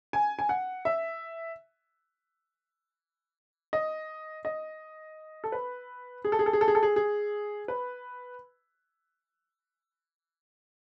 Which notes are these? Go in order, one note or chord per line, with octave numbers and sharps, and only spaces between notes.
G#5
G#5
F#5
E5
D#5
D#5
A4
B4
G#4
A4
G#4
A4
G#4
A4
G#4
A4
G#4
G#4
B4